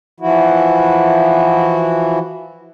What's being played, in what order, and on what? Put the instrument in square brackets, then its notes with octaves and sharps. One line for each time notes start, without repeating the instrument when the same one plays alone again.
[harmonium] E3 F3 E4 F#4